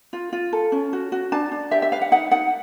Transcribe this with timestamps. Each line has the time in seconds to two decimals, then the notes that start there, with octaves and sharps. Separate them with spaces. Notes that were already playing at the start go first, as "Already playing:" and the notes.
0.13 F4
0.33 F4
0.53 A4
0.72 C#4
0.93 F#4
1.12 F#4
1.32 D4 A5
1.52 D4
1.71 G4 E5
1.82 E5
1.92 B4 F5
2.01 F#5
2.12 D#4 F#5
2.31 D#4 F#5